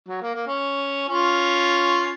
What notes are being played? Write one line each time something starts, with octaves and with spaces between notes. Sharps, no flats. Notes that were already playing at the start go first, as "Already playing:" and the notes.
F#3
A#3
A#3
C#4
C#4 F4